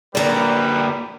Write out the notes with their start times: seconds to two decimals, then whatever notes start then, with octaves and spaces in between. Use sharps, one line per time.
0.15 D3 G3 A#3 B4 D5 A#5